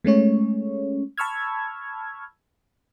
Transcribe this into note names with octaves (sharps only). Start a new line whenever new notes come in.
G#3 A3 C#4 C#5
A5 B5 C#6 E6 F6 G#6